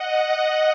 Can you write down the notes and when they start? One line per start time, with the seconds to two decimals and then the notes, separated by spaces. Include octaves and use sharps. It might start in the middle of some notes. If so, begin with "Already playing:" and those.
Already playing: D#5 F#5
0.16 D#5 F#5